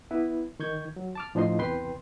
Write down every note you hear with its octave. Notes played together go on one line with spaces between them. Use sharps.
B3 E4 B4
D#3 C#6 G6 G#6
F#3
A5 D6 F6
A2 F3 D4 D#4 D#5 C6
E2 C3 B4 G5 C6